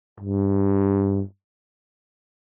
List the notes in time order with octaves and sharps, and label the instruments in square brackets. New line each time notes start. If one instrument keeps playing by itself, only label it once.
[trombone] G2